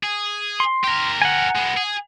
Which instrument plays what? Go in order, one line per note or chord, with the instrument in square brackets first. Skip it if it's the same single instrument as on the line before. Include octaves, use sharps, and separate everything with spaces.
[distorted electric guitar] G#4
[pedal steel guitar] C6
[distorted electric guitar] G4 A#4
[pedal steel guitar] F#5 G#5
[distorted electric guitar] G#3 B3
G#4